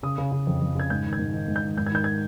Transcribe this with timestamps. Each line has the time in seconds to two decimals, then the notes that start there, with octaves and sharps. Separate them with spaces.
0.03 C#3 D#6
0.18 C#3
0.32 C#3
0.47 F2
0.61 F2
0.75 C#3 G#6
0.90 G#2 G6
1.05 D#3
1.13 G#6
1.19 G#2
1.33 D#3
1.48 G#2
1.56 G6
1.63 D#3
1.78 G#2 G6
1.87 G#6
1.92 D#3 G6
2.04 G#6